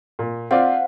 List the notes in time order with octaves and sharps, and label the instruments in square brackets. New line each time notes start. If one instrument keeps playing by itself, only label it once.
[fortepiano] A#2
[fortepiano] C4 F4 D5 [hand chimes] C5 F5 F#5